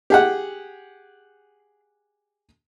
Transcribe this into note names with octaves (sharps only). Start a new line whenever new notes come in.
G4 G#4 F#5